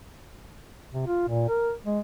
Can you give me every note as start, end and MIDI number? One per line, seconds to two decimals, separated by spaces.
0.93 1.06 48
1.07 1.27 65
1.28 1.47 46
1.48 1.72 70
1.85 2.00 56